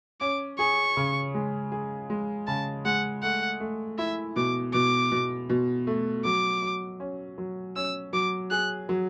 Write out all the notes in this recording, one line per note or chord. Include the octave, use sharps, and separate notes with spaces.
C#4 D6
G#4 C#6
C#3
G#3
G#4
G#3
C#3 A5
G#3 F#5
A3 F#5
A3
E4 E5
B2 D6
B2 D6
B2
B2
A3
F#3 D6
F#3
C#4
F#3
C#4 E6
F#3 D6
G#4 F#6
F#3